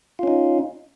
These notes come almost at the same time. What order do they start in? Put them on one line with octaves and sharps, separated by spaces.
F4 C#4 D#4